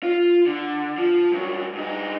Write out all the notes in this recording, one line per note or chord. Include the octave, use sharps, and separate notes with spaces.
F4
D3
F3
G2 F#3
G2 D#4